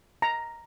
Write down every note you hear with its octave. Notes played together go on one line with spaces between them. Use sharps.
A#5